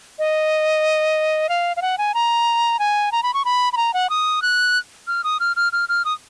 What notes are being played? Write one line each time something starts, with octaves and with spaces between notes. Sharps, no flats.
D#5
F5
F5
F#5
G#5
A#5
G#5
A#5
B5
C#6
B5
B5
A#5
F#5
D#6
F#6
F6
D#6
F6
F6
F6
F6
D#6